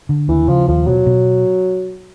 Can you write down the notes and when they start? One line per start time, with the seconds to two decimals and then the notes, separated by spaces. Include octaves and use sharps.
0.09 D3
0.28 D#2 E3
0.48 C#3 F3
0.68 D#2 F3
0.87 B2 F#3
1.06 B2